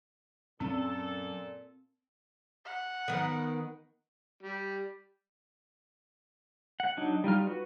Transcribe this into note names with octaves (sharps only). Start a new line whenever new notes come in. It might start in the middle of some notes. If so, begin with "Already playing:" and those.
F#2 A#2 C4 C#4 A4
F#5
D#3 B3
G3
F#5
F#3 D4 D#4
G3 D#4 F4 F6
F#4 B4